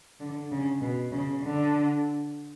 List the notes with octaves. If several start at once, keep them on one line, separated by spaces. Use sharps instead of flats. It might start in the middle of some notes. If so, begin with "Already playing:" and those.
D3
C#3
B2
C#3
D3